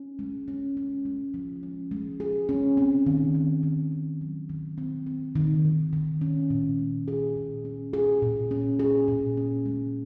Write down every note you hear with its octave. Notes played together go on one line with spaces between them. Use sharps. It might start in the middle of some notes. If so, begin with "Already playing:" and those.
Already playing: C#4
G#3
C#4
C#4
G#3
F3
C#4
G#3
G#4
C#4
C4
D#3
C4
D#3
D#3
F#3
D#3
C4
C4
D#3
D#3
D#3
C#4
A#2
G#3
G#4
A#2
C#4
G#4
A#2
C#4
G#4
A#2
C#4
G#3